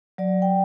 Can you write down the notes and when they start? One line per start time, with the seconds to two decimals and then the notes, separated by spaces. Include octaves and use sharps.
0.18 F#3 D5
0.42 G5